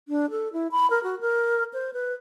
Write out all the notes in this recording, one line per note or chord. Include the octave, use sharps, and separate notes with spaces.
D4
A4
E4
B5
A#4
F#4
A#4
C5
B4